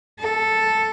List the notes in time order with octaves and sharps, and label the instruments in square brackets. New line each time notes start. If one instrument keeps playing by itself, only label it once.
[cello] A4